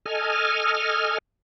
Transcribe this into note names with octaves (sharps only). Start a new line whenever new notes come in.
A4 D#5 G#5 F6